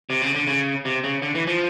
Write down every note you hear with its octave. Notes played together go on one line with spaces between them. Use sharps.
C3
C#3
D3
C#3
C3
C#3
D3
E3
F3